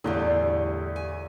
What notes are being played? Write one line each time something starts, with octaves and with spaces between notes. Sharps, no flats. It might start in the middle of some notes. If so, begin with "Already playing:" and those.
E2 A2 D3 G3 F4 G#4
G#5